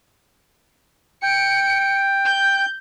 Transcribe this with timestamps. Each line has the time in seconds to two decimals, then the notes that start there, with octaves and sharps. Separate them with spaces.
1.23 G5 C#7 D7
2.25 G6